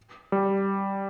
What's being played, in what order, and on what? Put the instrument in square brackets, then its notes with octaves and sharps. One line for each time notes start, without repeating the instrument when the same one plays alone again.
[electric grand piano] G3